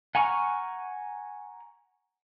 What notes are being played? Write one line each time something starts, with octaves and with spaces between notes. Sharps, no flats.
F#5 G#5 A#5 C#6 F6